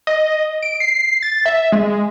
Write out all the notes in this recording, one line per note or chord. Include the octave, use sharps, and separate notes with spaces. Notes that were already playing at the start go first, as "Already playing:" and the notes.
D#5
D7
C7
A6
E5
G#3